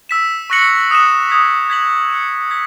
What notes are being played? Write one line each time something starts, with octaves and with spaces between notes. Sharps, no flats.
E6 B6 E7
C#6 F#6 A#6 C#7 F#7
D#6 F#6 A#6 C#7 E7
D#6 G#6 B6
G#6 B6 F#7
F#6 C#7 E7
G#6 B6